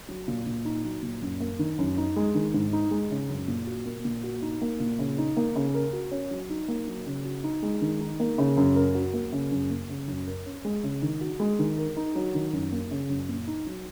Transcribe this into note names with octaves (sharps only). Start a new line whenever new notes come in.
F#3
A#2
A#2
D#4
F#3
A#2
F#2
A#3
D#3
F#2
D#4
G#3
D#3
G#2
D#4
G#3
C#3
F#2
A#2
F#4
A#3
A#2
F#4
D#4
A#3
A#2
C#3
D#4
A#3
C#3
A#4
F#4
C#4
F#3
D#4
A#3
F#3
C#3
F#4
D#4
G#3
D#3
D#4
A#3
C#3
F#2
A#4
F#4
A#3
C#3
F#2
A#3
C#3
F#2
A#4
C#4
G#3
C#3
D#3
F#4
G#3
D#3
A#4
D#4
F#3
D#3
F#2
A#3
C#3
F#2
A#2
D#4
F#3